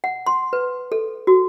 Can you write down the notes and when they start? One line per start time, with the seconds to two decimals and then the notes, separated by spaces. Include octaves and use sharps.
0.04 F#5
0.26 C6
0.53 B4
0.92 A4
1.27 F#4